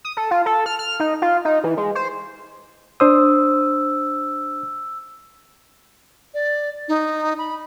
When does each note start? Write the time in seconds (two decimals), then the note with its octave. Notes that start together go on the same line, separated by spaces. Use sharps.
0.05 D#6
0.17 A4
0.31 F4
0.46 A4
0.66 F6
0.79 F6
1.00 D#4
1.22 F4
1.45 D#4
1.64 E3
1.77 G#3
1.95 C5
3.00 D4 C5 D#6 E6
6.34 D5
6.88 D#4
7.38 B5